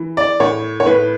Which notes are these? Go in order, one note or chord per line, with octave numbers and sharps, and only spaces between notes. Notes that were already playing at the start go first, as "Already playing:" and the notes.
Already playing: E3
D5
A2 C#5
C#5
A2 B4